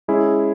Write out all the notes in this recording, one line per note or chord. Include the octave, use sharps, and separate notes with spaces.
G#3 C#4 E4 G#4